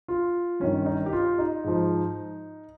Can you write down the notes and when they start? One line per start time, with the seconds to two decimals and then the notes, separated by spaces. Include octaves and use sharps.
0.08 F4
0.60 G2 D#3 C#4
0.86 D#4
1.06 G4
1.13 F4
1.39 D#4
1.64 G#2 F3